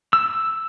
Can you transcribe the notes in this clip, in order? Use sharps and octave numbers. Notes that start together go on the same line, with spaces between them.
E6